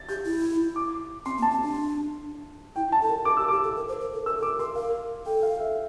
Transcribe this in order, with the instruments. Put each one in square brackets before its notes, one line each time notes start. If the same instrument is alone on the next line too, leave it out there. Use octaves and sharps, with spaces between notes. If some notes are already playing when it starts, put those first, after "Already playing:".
Already playing: [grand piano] A6
[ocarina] G4 [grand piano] G6
[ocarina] E4
[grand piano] D6
[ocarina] C4 [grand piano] C6
[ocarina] A#3
[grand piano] A5
[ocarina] C4
D4
[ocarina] E4 [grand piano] G5
[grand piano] A5
[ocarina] A4
A#4
[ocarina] A#4 [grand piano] D6
[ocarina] G4 [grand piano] E6
[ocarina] G4 [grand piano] D6
[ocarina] A4
A#4
C5
A#4
A4
[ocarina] A#4 [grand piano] E6
[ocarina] A4
[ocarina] A#4 [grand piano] D6
[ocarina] A#4 [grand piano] C6
[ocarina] A#4 [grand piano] F5
[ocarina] A4 [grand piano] G5
[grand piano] F5
E5